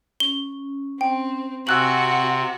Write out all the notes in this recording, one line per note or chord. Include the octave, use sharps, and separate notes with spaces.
C#4 G7
C4 G5
C3 C4 F#4 G#5 C#6 E6 F#6 F#7